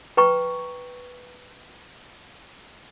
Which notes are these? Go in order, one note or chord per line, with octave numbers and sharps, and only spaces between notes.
B4 G5 A#5 C#6